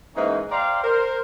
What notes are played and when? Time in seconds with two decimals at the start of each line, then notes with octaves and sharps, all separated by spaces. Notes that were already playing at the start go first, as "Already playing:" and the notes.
0.15 G#2 E3 A#3 C#4 D#4
0.51 C5 D5 F5 G5 A#5
0.83 A#4 C5